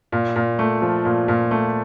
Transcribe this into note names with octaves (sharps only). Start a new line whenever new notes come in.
A#2
A#2
A3
F3
A#2
A#2
A3